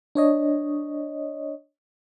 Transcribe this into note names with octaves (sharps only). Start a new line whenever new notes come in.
D4 C#5 D#5